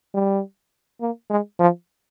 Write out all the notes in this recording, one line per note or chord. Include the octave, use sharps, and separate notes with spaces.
G3
A#3
G#3
F3